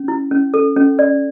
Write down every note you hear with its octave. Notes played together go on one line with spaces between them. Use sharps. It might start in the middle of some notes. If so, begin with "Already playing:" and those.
Already playing: C#4
E4
C#4
A4
C#4
D5